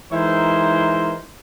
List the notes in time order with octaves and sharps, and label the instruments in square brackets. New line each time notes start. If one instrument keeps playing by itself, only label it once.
[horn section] E3 G#3 D#4 E4 A#4 C5